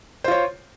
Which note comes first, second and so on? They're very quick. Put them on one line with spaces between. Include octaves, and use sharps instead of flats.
C5 F4 C#5